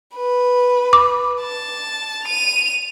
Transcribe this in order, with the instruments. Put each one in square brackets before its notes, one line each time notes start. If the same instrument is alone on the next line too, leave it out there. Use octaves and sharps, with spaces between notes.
[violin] B4
[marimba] D6
[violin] A5
D#7 F7